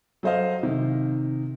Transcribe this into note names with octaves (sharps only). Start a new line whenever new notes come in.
F#3 A4 C5 D#5 F5
C3 D#3